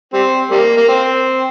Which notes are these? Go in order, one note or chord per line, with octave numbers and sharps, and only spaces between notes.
G3 C4
G3 A#3
A#3
C4